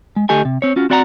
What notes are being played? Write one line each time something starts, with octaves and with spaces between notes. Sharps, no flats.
G#3
D2 A3 G4 A4 D#5 G#5
C3
C4 C#5
C#4 F4 F#4
C4 F#4 D5 F#5 G#5 A#5